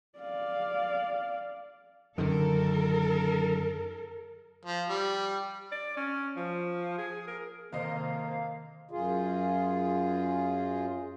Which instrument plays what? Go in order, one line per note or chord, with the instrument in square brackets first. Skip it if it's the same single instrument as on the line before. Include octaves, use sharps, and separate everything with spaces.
[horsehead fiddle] D5 F5
[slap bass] F#2 D3 D#3 [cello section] A4 A#4
[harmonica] F3
G3
[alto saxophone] D5
C#4
F3
G#4
A#4
[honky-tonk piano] F2 C5 D#5 [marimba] C3 D#3 [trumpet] A#3 [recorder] F5
[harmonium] F#2 F4 G#4